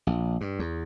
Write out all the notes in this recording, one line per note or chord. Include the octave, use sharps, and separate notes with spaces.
A#1
G2
E2